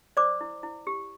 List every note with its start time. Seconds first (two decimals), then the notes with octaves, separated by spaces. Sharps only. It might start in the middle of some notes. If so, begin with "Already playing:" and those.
0.17 C5 D5 D6
0.41 E4
0.63 E4
0.87 G4